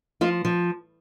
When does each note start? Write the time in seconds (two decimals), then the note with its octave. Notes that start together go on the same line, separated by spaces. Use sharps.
0.21 F3 F4
0.45 F3